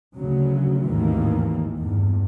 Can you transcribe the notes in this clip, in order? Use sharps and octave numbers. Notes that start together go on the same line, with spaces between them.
D2 C#3 F#3
G#1 D#2 A2 D#3 E3 A#3
E2 G2